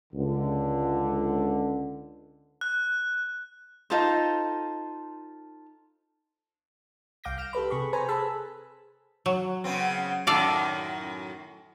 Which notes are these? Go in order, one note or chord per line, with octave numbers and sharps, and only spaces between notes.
C#2 D3
F#6
D#4 F4 A4 C5
C2 F5 D6 G6 A#6
F6 A#6 D7 E7
G4 A4 B4 B5
C3 G#4 B5 C#6
B4 C5 G#5 A#5
G#4 A4 B4 A5 B5 E6
F#3
C#3 B3 C4
F#2 A2 D#3 A4 D5 F5